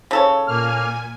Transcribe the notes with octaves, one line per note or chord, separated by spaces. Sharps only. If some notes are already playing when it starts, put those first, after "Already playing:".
C#3 A4 C#5
A#2 A#3 G#5 F6